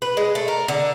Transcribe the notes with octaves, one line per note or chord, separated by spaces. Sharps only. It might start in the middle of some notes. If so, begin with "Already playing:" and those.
B4
G#3
A3
A#4
D3